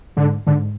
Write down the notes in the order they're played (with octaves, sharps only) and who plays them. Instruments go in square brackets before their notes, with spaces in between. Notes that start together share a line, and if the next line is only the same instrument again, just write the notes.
[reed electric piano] G#2 [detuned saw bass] D3
[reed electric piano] G#2 [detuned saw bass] D3